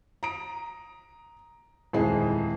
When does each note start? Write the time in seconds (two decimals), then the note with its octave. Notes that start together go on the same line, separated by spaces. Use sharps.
0.23 A#5 D#6 D7
1.93 D#1 F2 E3 G#3 D#4 G#4